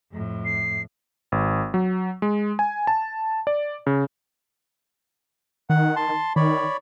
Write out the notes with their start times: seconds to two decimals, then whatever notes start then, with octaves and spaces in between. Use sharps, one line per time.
0.12 F2 A2
0.45 C7
1.32 G#1
1.74 F#3
2.22 G#3
2.59 G#5
2.87 A5
3.47 D5
3.87 C#3
5.70 D#3 F#5
5.96 A5 C6
6.36 D#3 C#5 D5 B5